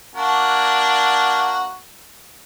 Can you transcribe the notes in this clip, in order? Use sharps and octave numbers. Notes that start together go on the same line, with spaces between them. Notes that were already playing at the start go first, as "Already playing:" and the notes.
A#3 D4 F#4